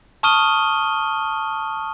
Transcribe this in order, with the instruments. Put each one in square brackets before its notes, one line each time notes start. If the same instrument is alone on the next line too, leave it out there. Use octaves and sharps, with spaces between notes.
[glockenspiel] A5 C#6 D#6 F6 D#7 G7